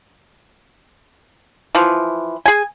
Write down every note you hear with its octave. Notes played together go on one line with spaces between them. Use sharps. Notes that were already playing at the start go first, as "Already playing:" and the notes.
E3 F3
G#4 G#5